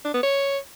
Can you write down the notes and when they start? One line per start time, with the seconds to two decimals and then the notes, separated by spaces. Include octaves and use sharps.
0.05 D4
0.14 B3
0.23 C#5